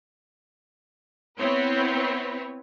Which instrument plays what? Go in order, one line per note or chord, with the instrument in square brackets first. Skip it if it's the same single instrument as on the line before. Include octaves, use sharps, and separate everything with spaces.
[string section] B3 C4 E4 B4 C#5